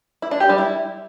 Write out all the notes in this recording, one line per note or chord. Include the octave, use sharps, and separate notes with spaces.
E4
D4
G4
G3
E4